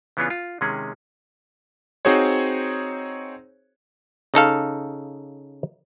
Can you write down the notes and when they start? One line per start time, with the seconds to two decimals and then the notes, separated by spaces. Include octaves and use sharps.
0.17 C#3 E3 B3 C#4 D4 F4
0.30 F4
0.61 C3 D#3 G#3 C#4 G#4
2.05 C4 D#4 F#4 G#4 C5 C#5
4.34 C#3 D#4 A4 F5